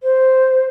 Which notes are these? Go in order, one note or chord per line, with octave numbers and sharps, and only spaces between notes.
C5